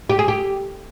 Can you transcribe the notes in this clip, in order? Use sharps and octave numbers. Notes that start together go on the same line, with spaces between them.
G4
G#4
G4